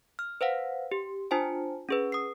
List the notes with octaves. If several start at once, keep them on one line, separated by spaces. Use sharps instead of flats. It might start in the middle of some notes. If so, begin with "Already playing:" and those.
F6
B4 C5 F5 F#5
G4
D4 F4 C5 G#5 A5
C#4 G#4 B4
D#6 C7